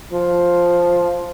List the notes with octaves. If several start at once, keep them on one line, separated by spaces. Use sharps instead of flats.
F3